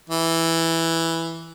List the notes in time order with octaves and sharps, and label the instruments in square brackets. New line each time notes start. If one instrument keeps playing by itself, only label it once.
[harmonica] E3